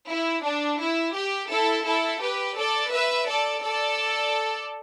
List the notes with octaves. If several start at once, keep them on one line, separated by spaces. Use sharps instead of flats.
E4
D4
E4
G4
E4 A4
E4 A4
G4 B4
A4 D5
B4 E5
A4 D5
A4 D5